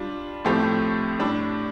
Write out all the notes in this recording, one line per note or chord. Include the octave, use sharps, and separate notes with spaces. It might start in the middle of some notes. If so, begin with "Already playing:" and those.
Already playing: G3 D4 F4
A2 F3 A3 C4 G4
A2 G3 D4